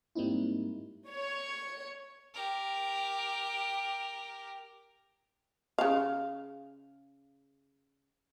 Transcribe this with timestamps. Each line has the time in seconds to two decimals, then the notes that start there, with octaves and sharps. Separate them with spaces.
0.15 G#2 G3 A#3 C4 D#4 E4
1.06 C#5
2.34 G4 A#4
5.79 C#3 F5